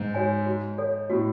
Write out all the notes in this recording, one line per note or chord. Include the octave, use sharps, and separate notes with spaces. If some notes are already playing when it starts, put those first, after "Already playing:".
Already playing: G#2
F#4 C#5 G#5
F#4
A4 C#5
A2 F#4